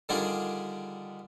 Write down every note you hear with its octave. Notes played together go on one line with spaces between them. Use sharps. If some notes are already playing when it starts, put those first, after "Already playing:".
D3 D#3 G3 D4 F4 G#4